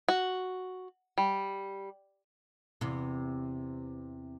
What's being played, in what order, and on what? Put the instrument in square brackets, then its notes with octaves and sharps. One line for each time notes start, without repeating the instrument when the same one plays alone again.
[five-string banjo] F#4
G3
[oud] E2 C3